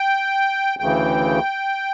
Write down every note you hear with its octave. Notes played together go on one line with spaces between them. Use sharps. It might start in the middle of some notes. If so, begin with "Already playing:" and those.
Already playing: G5
D2 C#3 E3 G5